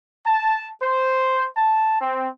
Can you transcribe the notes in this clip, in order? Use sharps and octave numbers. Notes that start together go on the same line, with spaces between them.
A5
C5
A5
C4